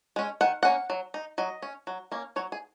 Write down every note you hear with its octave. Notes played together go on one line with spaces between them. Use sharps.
G#3 C#4
D#3 F#5
A#3 C#4 F#5
F#3
D#4
F#3 D#5
C#4
F#3
A#3 C#4
F#3 C#5
G#4